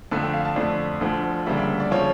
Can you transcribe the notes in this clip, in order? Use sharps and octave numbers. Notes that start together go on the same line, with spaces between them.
F2 D3 A3 A5
G5
F5
A5
F2 D3 A3 D5
D2 D3 F3 A3
D2 C#3 G3 A#3 E5
E5
D5
C#3 F3 C#5